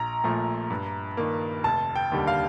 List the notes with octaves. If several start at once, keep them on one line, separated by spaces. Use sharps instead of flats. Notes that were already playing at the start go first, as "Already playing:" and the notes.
Already playing: A#1 A#5
A#2 F3 A3
G2
D#3 A#3
F1 A5
G5
D#2 D3 G3
F5